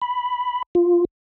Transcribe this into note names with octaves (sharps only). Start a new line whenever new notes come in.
B5
F4